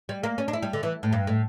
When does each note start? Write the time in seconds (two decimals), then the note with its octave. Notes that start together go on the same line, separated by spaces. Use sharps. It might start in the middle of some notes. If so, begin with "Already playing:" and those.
0.09 G3
0.23 A#3
0.38 C#4
0.48 D4
0.53 E4
0.62 G3
0.73 D3
0.83 E3
1.03 A2
1.12 G2
1.27 A2